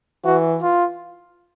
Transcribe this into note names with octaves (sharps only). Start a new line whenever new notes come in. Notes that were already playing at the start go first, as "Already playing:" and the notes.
E3 F#4
F4